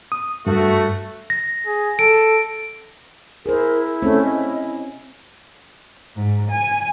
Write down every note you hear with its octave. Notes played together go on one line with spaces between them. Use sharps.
D#6
G2 A3 F#4
A#6
G#4
A4 D7
E4 G#4 A#4 C5
A3 C4 C#4
D#5
G#2
G#5